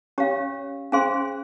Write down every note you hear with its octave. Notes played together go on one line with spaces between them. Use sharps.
C#4 G4 C#5 F5
C#4 G#4 C5 F5 C6